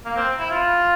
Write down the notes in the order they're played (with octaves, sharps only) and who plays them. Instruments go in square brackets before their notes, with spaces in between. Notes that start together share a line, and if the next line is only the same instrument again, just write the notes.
[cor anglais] A#3
C4
E4
F4